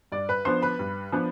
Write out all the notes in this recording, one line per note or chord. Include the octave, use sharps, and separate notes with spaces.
G2 D5
B4 B5
F3 B3 D4 C5 C6
B4 B5
G2
F3 B3 D4